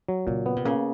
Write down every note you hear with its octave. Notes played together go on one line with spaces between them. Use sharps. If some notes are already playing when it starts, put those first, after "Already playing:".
F#3
A#2 C#3
B3
C3
C#3 A#3